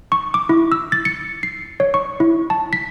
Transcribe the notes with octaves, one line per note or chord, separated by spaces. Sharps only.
C#6
D6
E4
E6
A6
C#7
C7
C#5
C#6
E4
A5
B6